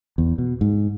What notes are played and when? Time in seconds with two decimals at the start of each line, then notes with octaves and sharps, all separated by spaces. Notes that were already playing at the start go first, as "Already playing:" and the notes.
0.18 E2
0.38 B2
0.61 G#2